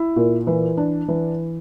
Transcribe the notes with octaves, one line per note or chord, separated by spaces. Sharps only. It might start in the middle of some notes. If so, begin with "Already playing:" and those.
Already playing: E4
A#2
E3
D4
E3